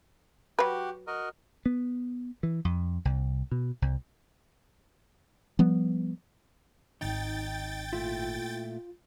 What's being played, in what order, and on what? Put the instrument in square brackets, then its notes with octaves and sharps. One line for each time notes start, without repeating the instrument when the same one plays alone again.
[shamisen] F#3 B4 [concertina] F#4 G4
[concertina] F#4 A#4 D#5
[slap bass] B3
E3
F2
C2
B2
C2
[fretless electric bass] F3 G3 B3
[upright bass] G#1 D#3 [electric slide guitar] D#4 [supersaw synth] G5 A6
[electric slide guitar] A#2 A3 E4 [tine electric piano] F4